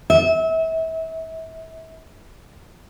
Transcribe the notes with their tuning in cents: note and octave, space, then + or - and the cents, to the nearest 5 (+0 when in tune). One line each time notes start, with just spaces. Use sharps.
E5 -30